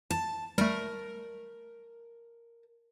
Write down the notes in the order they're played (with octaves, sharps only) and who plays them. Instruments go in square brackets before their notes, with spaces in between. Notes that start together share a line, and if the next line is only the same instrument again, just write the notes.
[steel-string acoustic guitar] A5
[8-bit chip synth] G3 A3 [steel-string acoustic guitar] A#4